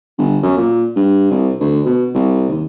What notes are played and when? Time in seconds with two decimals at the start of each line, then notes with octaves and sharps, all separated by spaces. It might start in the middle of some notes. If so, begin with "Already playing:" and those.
0.18 G1
0.43 F#2
0.57 A#2
0.96 G2
1.31 C2
1.60 D2
1.86 B2
2.14 C2
2.49 D#2